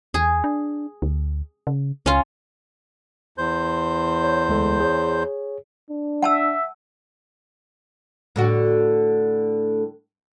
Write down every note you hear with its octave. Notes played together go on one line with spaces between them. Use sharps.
E2 G#4
D4
D2
C#3
C#2 C#4 F4
E2 C5 G6
C#5
D2 G#3 A4
G#4 C#5
D4
E5 F#5 A5 E6
A2 D3 F#4